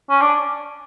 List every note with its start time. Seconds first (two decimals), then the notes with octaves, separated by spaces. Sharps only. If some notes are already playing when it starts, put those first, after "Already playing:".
0.10 C#4
0.22 D4